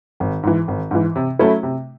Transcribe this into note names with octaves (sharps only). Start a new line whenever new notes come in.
G#1
G#2 E3
G#1
G#2 E3
C3
F#3 A3 C#4 E4
C3